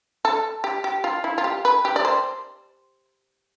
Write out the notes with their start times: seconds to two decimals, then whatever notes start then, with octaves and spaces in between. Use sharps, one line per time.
0.25 A4
0.64 G4
0.84 G4
1.04 F4
1.24 E4
1.38 F4
1.44 G4
1.65 B4
1.85 G4
1.96 D5
2.05 C5